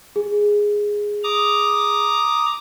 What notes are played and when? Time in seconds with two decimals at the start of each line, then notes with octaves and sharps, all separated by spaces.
0.16 G#4
1.24 A#5 D6 D#6